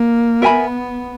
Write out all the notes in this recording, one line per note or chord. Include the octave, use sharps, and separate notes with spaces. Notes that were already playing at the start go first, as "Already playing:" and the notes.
Already playing: A#3
B3 A#4 E5 G#5 B5